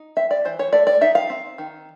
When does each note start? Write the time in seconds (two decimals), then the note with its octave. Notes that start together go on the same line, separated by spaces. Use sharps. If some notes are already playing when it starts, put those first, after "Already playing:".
Already playing: D#4
0.17 C4 E5
0.31 D5
0.45 E3 C5
0.59 C#5
0.73 A3 D5
0.87 D5
1.01 D#4 E5
1.15 F5
1.30 C4
1.58 D#3